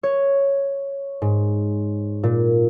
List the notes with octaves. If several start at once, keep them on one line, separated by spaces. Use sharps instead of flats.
C#5
G#2
A#2